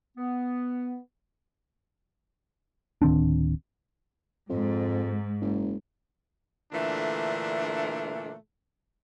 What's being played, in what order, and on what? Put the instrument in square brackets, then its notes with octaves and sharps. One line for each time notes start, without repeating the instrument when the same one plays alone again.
[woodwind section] B3
[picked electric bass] D1 D#3 C4 D4
[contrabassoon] F2 [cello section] G#2
[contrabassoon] F#1
[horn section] A#2 D3 E3 A3 D4